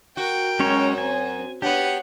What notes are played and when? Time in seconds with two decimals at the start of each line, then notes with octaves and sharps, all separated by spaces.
0.17 F#4 A#4 G5
0.60 F#2 G#3 C#4 C#5
0.98 C4 G#5
1.62 B3 D4 G4 C#5 F#5